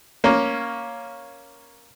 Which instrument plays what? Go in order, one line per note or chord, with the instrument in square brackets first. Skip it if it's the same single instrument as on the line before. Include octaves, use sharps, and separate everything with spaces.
[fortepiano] A#3 C#4